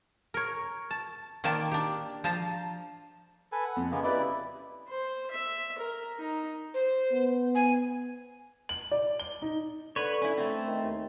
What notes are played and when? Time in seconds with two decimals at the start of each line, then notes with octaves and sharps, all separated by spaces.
0.34 A#4 C#5
0.91 A5
1.44 D#3 A#3 D5 G5 A5
1.71 D4 G4
2.24 F3 C5 A5 A#5
3.52 A4 B4 G#5
3.65 F#5
3.76 F2
3.91 C#3 G#3 A#3 B3
4.04 E4 G4 B4 D5 D#5
4.88 C5
5.31 E5
5.78 A#4
6.18 D#4
6.74 C5
7.12 B3
7.55 G#5
8.69 F#7
8.91 D5
9.20 G7
9.42 D#4
9.96 D3 B4 C#5
10.22 C#4 E4
10.38 A3 C4
10.67 D#3
10.84 D#2